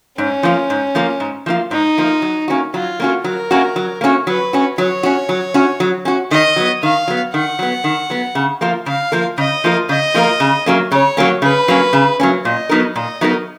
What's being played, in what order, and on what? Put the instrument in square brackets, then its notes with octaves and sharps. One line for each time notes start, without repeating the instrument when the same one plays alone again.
[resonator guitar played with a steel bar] G#2 [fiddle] C#4
[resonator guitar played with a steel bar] F3 A#3 F4
G#2
F3 A#3 F4
G#2
F3 A#3 F4
[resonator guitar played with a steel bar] G#2 [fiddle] D#4
[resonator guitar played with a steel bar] F3 A#3 F4
F#3
A#3 C#4 F#4
[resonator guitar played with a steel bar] F#3 [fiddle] F4
[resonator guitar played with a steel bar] A#3 C#4 F#4
[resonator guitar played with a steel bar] F#3 [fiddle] A#4
[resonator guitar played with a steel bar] A#3 C#4 F#4
F#3
A#3 C#4 F#4
[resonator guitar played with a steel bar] F#3 [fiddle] B4
[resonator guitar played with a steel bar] C#4 F#4
[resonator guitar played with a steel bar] F#3 [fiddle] C#5
[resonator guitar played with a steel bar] C#4 F#4
F#3
C#4 F#4
F#3
C#4 F#4
[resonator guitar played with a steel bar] D#3 [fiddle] D#5
[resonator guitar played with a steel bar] F#3 B3
[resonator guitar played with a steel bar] D#3 [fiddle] F5
[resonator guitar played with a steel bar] F#3 B3
[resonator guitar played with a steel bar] D#3 [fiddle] F#5
[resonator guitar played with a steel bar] F#3 B3
D#3
F#3 B3
C#3
F3 A#3 F4 A#4
[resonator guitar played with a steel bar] C#3 [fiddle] F5
[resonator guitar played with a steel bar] F3 A#3 F4 A#4
[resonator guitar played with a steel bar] C#3 [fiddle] D#5
[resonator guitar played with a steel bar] F3 A#3 F4 A#4
[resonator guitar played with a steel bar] C#3 [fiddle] D#5
[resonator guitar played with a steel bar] F3 A#3 F4 A#4
C#3
F#3 A#3 C#4
[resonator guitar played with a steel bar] C#3 [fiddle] C#5
[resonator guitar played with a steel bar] F#3 A#3 C#4
[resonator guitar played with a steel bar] C#3 [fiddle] B4
[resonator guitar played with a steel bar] F#3 A#3 C#4
C#3
F#3 A#3 C#4
[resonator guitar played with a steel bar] A#2 [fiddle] D#5
[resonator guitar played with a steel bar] F#3 B3 D#4 A#4
[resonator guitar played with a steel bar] A#2 [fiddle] D#5
[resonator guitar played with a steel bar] F#3 B3 D#4 A#4